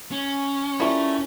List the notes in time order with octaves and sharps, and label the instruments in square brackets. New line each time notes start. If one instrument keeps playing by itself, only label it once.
[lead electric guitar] C#4
[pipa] G3 A3 [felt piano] E4 F4 A#4